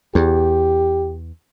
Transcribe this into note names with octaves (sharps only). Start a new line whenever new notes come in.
E2 G4